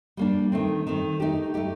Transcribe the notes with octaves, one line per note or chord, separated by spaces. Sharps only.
G3 A#3 D4
D#3 A3 C4
D#3 A3 C4
A3 D#4 G4
A3 D#4 G4